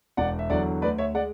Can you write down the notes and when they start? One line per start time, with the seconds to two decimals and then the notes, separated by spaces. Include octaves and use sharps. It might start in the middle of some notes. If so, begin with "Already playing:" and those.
0.17 E1 D5 F#5
0.39 E5
0.50 E2 D3 F#3 D5 F#5
0.82 D2 B4 D5
0.98 C#5 E5
1.14 G#3 D5 F#5